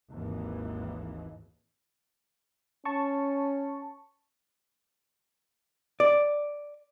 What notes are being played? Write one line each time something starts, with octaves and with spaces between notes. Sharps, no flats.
G#1 D#2 E3
C#4 A5 C#6
D5